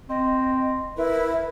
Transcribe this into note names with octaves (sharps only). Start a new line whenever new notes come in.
C4 D#5
E4 A#4 B4